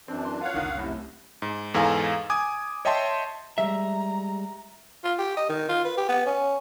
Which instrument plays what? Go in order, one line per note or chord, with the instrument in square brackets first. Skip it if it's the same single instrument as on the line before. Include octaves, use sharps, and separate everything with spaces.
[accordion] F#2 E3 D4 [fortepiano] C4
[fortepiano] C6
[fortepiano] F4 C#5 [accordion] F5 F#5
[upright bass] F1 C2 [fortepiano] D3 D#3 C#4
[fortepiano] F#2 A2 [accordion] C3
[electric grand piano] G#2
E2 G#2 A4 F5 G#5 A#5
G#5 D6 D#6 G#6
C#5 D#5 E5 G5 A5 C6
[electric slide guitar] G3 G#3 [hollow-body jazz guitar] E5 [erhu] A#5
[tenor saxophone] F4
G4
D#5
D#3
F4
B4
G4
B3
C#4